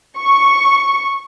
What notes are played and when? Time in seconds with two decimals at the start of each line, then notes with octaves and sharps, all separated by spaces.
0.17 C#6